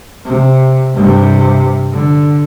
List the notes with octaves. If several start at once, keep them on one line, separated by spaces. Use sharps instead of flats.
C3
G2 C3
D3